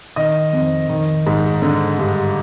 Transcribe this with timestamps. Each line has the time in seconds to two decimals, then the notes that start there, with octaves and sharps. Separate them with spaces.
0.16 D#3 D#5
0.53 F2
0.89 D#3
1.26 G#2
1.62 D3
1.98 G2